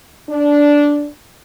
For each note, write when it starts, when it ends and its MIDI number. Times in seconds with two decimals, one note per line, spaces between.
0.30 1.07 62